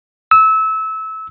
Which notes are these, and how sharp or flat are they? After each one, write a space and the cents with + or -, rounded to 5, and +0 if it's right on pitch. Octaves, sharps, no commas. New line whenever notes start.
E6 -25